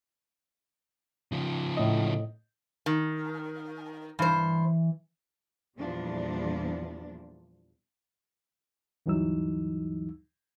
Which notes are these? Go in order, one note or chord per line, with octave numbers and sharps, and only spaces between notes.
C#3 F3
A2 D#5
D#3
G2 E3 C5
E2 A#2 F3 G3 D4
D2 G2 E3 F#3 D#4 E6